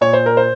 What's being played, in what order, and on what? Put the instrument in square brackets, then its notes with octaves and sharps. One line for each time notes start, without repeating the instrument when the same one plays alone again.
[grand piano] A#2 C#5
C5
A#4
C5